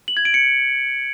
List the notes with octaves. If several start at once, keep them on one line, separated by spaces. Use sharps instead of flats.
F#7
G#6
D7
C#7